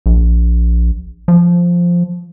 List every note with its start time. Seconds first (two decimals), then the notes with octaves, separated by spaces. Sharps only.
0.06 A#1
1.28 F3